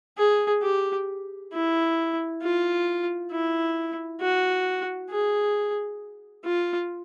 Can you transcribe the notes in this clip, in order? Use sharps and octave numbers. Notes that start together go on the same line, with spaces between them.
G#4
G4
E4
F4
E4
F#4
G#4
F4